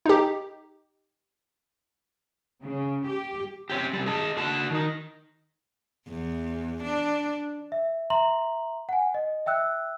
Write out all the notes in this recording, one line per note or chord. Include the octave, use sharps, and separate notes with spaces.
D#4 G4
C#3
G4
C4 C#4 G4
C3 G3
G#4 D#5 A5
D3 F#4 A5
D#3 D#4
E2
D4
E5
E5 A#5 C6 F#7
F#5 G#5
D#5
E5 G5 E6 F#6